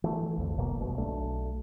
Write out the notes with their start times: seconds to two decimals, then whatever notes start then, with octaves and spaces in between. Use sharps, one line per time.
0.04 E3 A3
0.37 B1 F2 D3
0.58 E1 E2 B2 A#3
0.79 G1 B2
0.97 B1 A3 D4